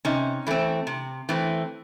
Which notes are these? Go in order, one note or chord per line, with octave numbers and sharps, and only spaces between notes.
C3 C#4 D#4
E3 A3 C4
C3
E3 A3 C4